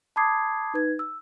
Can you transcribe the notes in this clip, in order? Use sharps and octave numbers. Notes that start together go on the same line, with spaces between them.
A5 B5 D6 D#6 G#6 C7
D#4 B4 G#6
E6